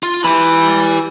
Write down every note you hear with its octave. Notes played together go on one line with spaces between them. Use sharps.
F4
E3 G4 B5